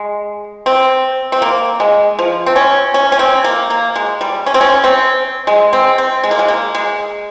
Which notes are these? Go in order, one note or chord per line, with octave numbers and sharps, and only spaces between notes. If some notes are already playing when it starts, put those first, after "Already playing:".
Already playing: G#3
C4
C4
A#3
G#3
F3
C4
C#4
C#4
C#4
C4
A#3
A#3
G#3
G3
C#4
C4
C#4
C4
G#3
C4
C4
G#3
A#3
G#3
A#3
G#3